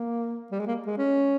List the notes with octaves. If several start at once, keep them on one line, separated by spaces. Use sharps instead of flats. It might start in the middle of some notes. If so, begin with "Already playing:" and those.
Already playing: A#3
G3
G#3
A#3
G#3
C#4